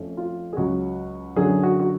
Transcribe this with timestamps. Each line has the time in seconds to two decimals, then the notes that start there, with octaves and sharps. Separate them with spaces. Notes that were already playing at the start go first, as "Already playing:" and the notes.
Already playing: F2 F3 A3 C#4
0.17 F4
0.53 G#4
0.57 C#2 C#3 F#3 F#4
1.36 F#2 D3 F#3 G#4
1.63 F#4
1.79 F#4